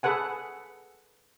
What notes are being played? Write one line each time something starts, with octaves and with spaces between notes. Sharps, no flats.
G#4 A4 B4 F#5 G#5